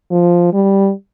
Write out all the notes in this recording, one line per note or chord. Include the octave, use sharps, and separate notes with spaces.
F3
G3